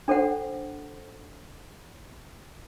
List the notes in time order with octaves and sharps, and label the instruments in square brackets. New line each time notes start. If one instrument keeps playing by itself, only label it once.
[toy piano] D4 A4 C5 F#5